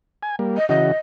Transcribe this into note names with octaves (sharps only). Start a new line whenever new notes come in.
G#5
G3 A#3
D#5
C#3 E3 F#4 D#5